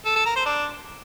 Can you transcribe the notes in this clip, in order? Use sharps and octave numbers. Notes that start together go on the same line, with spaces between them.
A4
A4
A#4
C5
D4